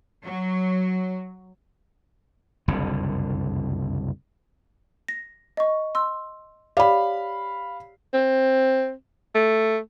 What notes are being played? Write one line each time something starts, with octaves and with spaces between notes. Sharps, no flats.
F#3
F#1 C2 F2 D3
A#6
D#5 C#6
C6 E6
G4 C#5 D5 F5 B5
C4
A3